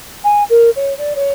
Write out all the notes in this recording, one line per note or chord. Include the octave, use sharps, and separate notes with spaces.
G#5
A#4
C#5
D5
C#5